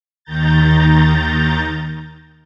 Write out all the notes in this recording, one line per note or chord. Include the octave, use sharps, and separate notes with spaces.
D#2 D#3 A#5 G6 A6